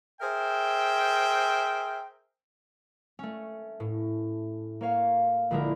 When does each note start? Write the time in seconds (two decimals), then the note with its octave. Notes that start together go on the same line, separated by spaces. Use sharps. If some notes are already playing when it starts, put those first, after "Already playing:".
0.20 G#4 A#4 C5 E5 G5
3.19 A3 C#4
3.80 A2
4.81 A#3 C#5 F5
5.50 A#1 D3 G#3 E4 A#4